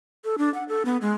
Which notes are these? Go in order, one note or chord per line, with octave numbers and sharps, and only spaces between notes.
A4
D4
F#5
A4
B3
G#3